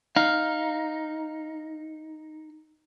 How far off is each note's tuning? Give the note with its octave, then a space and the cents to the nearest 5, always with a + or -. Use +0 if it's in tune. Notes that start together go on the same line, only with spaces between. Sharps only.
D#4 +0 F5 +0